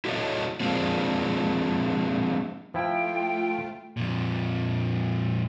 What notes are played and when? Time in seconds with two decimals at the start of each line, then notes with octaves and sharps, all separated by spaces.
0.05 E4 F#4 A4 C#5 D#5
0.61 F3 G#3 A#3 C4 D4
2.74 F3 A3 E4 F4 G5
3.97 F2 A#2